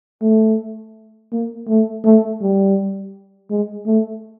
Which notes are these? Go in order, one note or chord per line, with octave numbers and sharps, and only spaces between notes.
A3
A#3
A3
A3
G3
G#3
A3